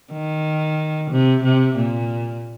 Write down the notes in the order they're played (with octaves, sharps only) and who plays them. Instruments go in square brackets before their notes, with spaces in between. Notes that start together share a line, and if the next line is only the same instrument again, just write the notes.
[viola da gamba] D#3
C3
C3
A#2